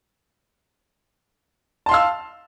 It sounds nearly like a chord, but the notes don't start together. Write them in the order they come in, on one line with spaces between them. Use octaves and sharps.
A5 C6 F5 E6